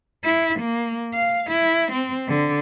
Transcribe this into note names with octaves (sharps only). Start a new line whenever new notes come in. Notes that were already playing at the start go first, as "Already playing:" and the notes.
E4
A#3
F5
E4
C4
D3